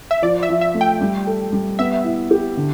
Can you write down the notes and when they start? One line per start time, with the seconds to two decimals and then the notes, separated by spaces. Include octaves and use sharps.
0.11 E5
0.22 F3 D5
0.43 E5
0.49 F3
0.61 E5
0.74 A3
0.81 G5
1.01 G3
1.27 A4
1.52 G3
1.79 B3 E5
2.04 E4
2.31 G4
2.57 D3